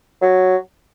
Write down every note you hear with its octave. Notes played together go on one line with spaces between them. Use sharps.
F#3